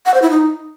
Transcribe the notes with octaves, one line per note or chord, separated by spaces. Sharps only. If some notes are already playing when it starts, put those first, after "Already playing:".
F#5
C5
E4
D#4